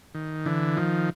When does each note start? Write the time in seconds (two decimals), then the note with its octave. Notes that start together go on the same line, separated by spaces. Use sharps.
0.15 D#3
0.46 D3 E3
0.77 D#3 F3